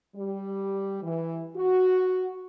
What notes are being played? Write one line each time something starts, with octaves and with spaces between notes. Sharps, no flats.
G3
E3
F#4